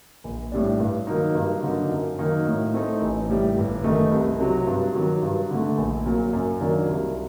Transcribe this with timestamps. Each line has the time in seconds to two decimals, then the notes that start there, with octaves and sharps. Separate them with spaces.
0.24 A#1
0.52 A2 G3 D4
0.80 G2
1.07 D#3 F#3 A#3 D#4
1.35 G2
1.63 D3 F#3 A#3 D#4
1.91 F#2
2.18 D#3 F#3 A#3 D#4
2.46 A2
2.74 A3 C4 D#4
3.01 A1
3.29 A2 G3
3.57 G1
3.84 F#2 D#3 A3 D#4
4.11 C2
4.39 C3 F#3
4.67 G2
4.95 D#3 F#3
5.23 G2
5.50 D3 A3
5.78 A#1
6.06 A#2 F#3
6.33 F#2
6.61 D#3 F#3 A#3 D4
6.89 C2